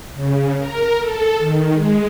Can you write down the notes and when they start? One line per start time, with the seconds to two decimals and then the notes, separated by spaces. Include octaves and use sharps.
0.15 C#3
0.57 A#4
1.00 A4
1.38 D#3
1.72 G#3